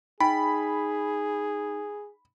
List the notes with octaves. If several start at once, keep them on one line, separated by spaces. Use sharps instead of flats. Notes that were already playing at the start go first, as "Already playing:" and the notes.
D#4 G#4 G5 G#5 B5